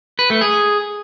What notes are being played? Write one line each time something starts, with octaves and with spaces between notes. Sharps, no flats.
B4
A3
G#4